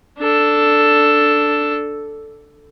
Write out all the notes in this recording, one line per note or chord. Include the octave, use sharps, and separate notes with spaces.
D4 A4